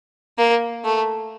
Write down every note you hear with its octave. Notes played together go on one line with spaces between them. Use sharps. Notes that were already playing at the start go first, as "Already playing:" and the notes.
A#3
A3